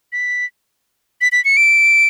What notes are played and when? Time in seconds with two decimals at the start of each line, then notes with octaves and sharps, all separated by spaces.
0.13 B6
1.21 B6
1.32 B6
1.45 C#7
1.57 D7